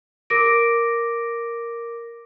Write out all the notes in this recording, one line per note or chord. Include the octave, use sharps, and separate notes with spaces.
A#4 D6 A#6 D7